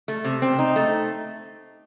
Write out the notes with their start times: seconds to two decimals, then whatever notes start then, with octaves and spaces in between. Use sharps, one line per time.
0.08 A3
0.24 C3
0.42 C4
0.59 D#4
0.76 A3